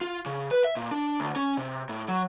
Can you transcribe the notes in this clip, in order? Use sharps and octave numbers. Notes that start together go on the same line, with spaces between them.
F4
C#3
B4
E5
A#2
D4
D2
C#4
C3
A2
F#3